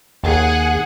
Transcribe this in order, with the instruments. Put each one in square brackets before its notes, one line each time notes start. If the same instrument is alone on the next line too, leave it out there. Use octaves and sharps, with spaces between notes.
[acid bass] D#2 [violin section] G#4 F#5 G#5